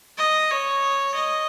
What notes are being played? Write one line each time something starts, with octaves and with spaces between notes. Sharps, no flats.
D#5
C#5
D#5